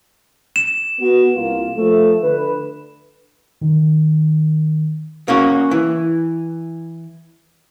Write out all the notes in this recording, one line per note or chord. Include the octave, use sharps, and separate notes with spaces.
E7
B3 F#4
C2 A#3 F4
F3 A3
D3 B4
D#3
A#3 C#4 F#4
E3